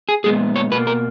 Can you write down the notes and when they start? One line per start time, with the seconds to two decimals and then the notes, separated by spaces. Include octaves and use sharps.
0.09 G#4
0.24 A#2 G#3 B3 G#4
0.56 C#5
0.72 B2 A#3 B4
0.87 A#4